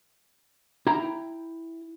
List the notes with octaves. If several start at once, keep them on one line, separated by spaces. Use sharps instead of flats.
E4 G5 A#5